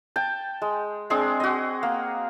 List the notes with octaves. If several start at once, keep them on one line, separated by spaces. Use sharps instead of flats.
G5 A5
G#3
G#3 C4 D4 G#4
F#4 D#5
A#3